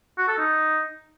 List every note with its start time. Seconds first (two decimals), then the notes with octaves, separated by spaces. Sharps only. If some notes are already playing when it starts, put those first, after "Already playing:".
0.18 F#4
0.28 A4
0.38 D#4